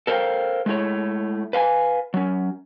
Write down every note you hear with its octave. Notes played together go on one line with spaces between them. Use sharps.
A4 A#4 C5 E5 F5 G5
G#3 A3 E4 C#5
B4 F5 G5 G#5
F#3 C#4